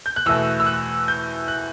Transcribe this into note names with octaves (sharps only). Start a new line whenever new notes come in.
G6
F#6
E2 B2 A3 E6
E6
F#6
G6
F#6